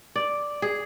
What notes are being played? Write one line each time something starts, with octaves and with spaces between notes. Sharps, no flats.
D5
G#4